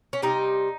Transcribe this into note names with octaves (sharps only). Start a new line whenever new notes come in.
C#4
C3 G3 D#4